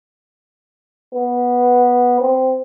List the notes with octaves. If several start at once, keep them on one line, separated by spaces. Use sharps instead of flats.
B3
C4